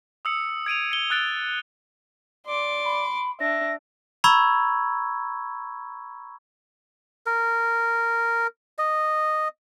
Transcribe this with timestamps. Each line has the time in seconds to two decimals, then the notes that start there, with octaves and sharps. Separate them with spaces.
0.25 D#6 E6 C#7
0.66 G#6 D7 D#7 F7
0.91 C#7 G7
1.10 E6 F#6 A6 D7 G7
2.47 D5 C6 D6
2.85 B5
3.40 D4 E5 A#6
4.24 A#5 B5 C#6 E6 G#6
7.26 A#4
8.78 D#5